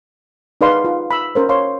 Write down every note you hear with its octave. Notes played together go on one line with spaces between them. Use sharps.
D#4 G#4 B4 D5 F5 C6
F4
B5 E6
C#4 A#4 C5
C#5 F5 C6